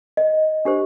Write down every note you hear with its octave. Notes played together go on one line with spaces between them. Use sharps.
D#5
D4 G4 C5